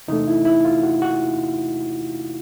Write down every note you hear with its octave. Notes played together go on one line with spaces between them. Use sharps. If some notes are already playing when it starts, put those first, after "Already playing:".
E2 C3 E3 A3 D#4
E4
E4
F4
F#4
F#4